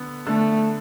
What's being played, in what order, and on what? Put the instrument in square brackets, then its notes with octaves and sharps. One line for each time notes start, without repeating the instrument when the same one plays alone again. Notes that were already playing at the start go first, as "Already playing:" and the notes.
Already playing: [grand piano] D3 B3
[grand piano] D3 [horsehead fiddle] A3